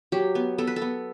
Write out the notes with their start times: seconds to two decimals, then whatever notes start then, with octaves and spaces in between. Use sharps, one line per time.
0.12 F#3 G4
0.35 B3
0.58 B3 A4
0.67 B4
0.76 A4
0.82 B3